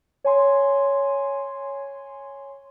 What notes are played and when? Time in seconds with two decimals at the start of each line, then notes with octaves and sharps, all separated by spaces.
0.24 C#5 G#5 C6